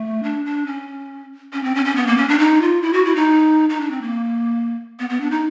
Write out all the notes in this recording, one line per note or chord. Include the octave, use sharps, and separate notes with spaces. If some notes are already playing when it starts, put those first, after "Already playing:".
Already playing: A3
D4
D4
C#4
C#4
C4
C#4
C#4
B3
A#3
C#4
D4
D#4
F4
E4
F#4
E4
D#4
D#4
D4
C4
A#3
B3
B3
D4
D#4